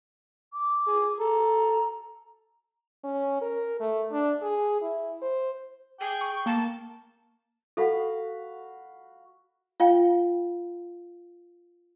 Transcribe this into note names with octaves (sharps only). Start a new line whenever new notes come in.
D6
G#4
A4 A#5
C#4
A#4
A3
D4
G#4
E4
C5
G#4 G5
C#6
A#3 A5
F#4 A4 F5 F#5 B5
F4 F5 G5